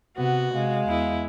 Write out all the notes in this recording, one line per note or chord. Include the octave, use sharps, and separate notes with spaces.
C3 B3 F#4 F#5
C3 G#3 F5
E2 E4